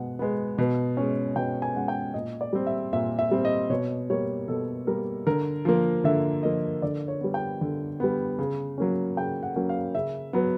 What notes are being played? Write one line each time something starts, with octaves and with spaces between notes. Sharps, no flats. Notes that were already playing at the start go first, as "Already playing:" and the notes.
Already playing: B2 G#3 F#5
G#3 B3
B2
G#3 C#4
B2 G5
G#5
G#3 C#4 F#5
G5
A#2 D#5
D5
G3 C4
E5
A#2 E5
E5
G3 C4
D#5
B2 C#5
G3 A#3 C#5
B2 A4
G3 A#3 A#4
D3 A#4
F3 A#3
D3 E5
F3 A#3 D#5
D3 D5
C#5
G3 B3
G5
D3
G3 B3
C#3
F#3 A#3 C#4
C#3 G5
F#5
F#3 A#3 C#4
F5
C#3 E5
F#3 B3